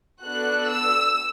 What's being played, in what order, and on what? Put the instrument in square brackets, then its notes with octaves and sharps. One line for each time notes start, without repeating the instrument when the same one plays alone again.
[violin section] B3 D4 F#4 A4 F#6
E6